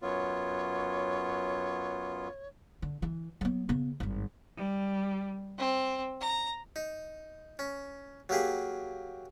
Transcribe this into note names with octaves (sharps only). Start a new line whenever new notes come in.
F#2 B3 F4 C#5
D3
E3
F#3 B3
C#3 B3
G#1 G2
G3
C4
A#5
D#4
C#4
F#3 A#3 G4 G#4